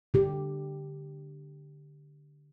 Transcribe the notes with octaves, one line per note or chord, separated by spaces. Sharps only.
D3 G4